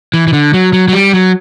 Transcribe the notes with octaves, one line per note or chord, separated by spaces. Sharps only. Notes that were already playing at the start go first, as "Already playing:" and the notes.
E3
E3
D3
F#3
F#3
F#3
G3
F#3